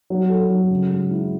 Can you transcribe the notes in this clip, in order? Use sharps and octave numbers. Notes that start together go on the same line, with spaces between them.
F#3
A4
F#3
C#3
G#3
E4